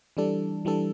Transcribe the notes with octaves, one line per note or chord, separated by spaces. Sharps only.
E3 G3 D4 A4
E3 G3 D4 A4